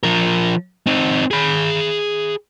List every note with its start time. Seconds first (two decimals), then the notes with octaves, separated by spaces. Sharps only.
0.03 F3 A#4
0.87 C4 D#4
1.31 G#4 B5